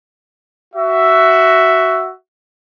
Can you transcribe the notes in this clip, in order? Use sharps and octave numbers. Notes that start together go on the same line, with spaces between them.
F#4 E5